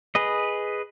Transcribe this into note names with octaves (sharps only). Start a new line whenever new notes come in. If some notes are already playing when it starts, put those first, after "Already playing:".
G#4 B4 D#5